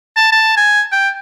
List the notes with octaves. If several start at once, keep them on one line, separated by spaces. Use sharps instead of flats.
A5
A5
G#5
G5